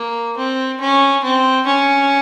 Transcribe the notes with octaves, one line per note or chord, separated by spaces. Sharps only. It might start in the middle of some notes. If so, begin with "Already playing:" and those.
Already playing: A#3
C4
C#4
C4
C#4